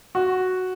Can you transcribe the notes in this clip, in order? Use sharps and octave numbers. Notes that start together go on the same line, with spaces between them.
F#4